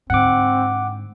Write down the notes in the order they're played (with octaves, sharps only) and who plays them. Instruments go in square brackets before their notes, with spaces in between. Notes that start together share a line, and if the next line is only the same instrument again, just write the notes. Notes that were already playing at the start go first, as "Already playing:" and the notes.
[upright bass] G#2 D3 [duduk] C4 [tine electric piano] F#5 D6